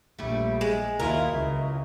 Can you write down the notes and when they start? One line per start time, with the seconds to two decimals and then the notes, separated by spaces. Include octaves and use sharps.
0.19 A#1 G3 A3
0.61 G#3
1.00 D#2 F#3 E4 F4 A#4
1.30 C#2 C#3